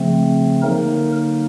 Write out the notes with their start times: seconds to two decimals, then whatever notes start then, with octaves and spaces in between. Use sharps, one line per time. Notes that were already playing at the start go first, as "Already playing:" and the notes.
Already playing: C#3 F3 A3 C4
0.62 D3 F#3 A#3 D#4 A#4